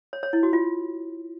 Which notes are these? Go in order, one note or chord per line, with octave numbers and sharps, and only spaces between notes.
C#5
C#5
E4
F#4
F4